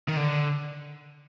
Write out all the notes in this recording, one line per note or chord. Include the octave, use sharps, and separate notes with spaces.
D#3
D3